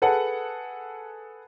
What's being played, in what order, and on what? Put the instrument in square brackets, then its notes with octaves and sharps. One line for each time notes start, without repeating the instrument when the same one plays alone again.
[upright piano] G#4 A4 B4 F#5 A5